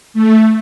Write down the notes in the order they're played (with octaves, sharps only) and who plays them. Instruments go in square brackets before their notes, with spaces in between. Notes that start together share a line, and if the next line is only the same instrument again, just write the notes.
[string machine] A3